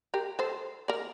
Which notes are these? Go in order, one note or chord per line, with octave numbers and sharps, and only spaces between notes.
G4 A#4
A4 C5
A#4 D5